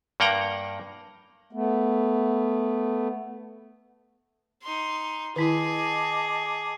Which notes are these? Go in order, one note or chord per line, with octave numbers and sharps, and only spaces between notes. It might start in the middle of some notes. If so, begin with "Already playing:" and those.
G2 A#3 F#5 G5 A#5
A3 B3
D#4 C6
D#3 E4 G#4 D#5 A5 D6